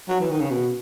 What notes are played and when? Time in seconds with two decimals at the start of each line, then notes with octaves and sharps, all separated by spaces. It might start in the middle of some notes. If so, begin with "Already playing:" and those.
0.09 F#3
0.20 E3
0.30 D#3
0.40 C#3
0.50 B2